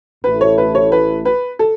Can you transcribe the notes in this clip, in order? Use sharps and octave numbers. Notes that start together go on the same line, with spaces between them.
A1 A2 A3 E4 A4 B4
C#5
B4
C#5
B4
B4
A4